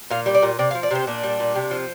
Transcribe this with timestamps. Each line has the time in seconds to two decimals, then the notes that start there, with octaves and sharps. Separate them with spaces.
0.10 A#2 F5
0.26 G3
0.35 D5
0.43 A#2
0.59 C3 D5
0.71 F5
0.75 F3
0.83 D5
0.91 C3 C5
1.07 A#2 D4
1.23 G3
1.40 A#2
1.55 C3
1.71 F3